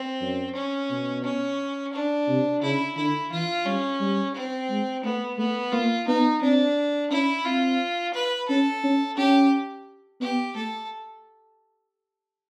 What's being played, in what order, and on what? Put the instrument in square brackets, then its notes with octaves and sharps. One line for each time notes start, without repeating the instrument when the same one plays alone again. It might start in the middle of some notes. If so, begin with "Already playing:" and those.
Already playing: [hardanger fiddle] C4
[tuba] F#2
[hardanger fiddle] C#4
[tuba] B2
[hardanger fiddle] C#4
D4
[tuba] C3
[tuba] C#3 [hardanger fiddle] E4
[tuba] D3 [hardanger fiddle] E4
[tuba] E3 [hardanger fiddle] F4
[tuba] G3 [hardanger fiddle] C#4
[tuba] G3
[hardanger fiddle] C4
[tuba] G#3
[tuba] A3 [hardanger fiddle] B3
[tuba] A3 [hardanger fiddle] B3
[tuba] A#3 [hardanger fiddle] F4
[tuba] B3 [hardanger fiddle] D#4
[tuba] C4 [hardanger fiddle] D4
[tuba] C#4 [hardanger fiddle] E4
[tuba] C4 [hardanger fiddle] F4
[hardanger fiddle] B4
[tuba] C#4 [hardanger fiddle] A4
[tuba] C#4
[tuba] C#4 [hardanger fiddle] G4
[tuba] B3 [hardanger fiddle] G4
[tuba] A3 [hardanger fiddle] A4